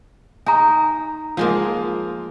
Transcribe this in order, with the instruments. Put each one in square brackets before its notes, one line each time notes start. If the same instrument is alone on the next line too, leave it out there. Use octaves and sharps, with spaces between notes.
[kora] D#4 [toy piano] G#5 A#5
[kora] F3 G#3 A#3